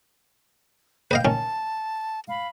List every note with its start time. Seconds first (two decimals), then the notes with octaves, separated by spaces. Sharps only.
1.11 B4 D#5 F5 G5 G6
1.25 D#3 C#4 A5
2.28 F5 B5